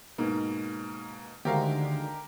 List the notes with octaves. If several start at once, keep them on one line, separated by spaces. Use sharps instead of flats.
G#2 B2 A#3
D2 D3 D#3 G#3 G4 A#4 C5 F5